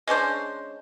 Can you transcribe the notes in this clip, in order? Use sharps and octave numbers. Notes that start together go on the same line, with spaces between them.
G#3 C#4 D4 C5